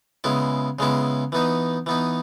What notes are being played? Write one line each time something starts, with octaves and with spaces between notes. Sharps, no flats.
C#3 G#3 B3 E4
C#3 G#3 B3 E4
E3 B3 D#4
E3 B3 D#4